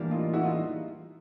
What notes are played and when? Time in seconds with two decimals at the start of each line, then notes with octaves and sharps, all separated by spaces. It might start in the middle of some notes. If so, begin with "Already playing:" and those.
Already playing: A2 E3 G3 A#3 D4
0.11 D#4 F4
0.33 E4 F#4
0.43 D#4 F4